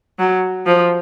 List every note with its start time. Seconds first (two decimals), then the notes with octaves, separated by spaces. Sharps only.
0.19 F#3
0.66 F3